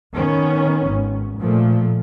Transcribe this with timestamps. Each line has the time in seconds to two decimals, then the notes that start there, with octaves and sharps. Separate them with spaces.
0.15 D#3 B3 C#4
0.88 G#1
1.39 A#2 F3 A3